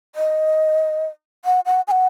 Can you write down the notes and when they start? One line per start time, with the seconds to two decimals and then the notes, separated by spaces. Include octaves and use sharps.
0.15 D#5
1.45 F#5
1.66 F#5
1.88 G#5
1.91 F#5